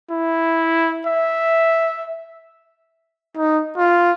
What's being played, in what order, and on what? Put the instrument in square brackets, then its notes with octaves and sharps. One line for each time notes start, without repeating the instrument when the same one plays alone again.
[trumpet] E4
E5
D#4
F4